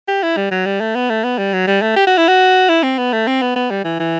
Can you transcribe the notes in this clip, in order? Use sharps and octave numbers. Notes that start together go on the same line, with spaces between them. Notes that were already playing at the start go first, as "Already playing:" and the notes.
G4
E4
G3
F#3
G3
A3
B3
A3
B3
G3
F#3
G3
A3
G4
F#4
E4
F#4
E4
C4
B3
A3
C4
B3
B3
G3
E3
E3